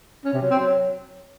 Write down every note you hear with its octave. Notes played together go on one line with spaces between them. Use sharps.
C#4
C3
F#3
C4
F#3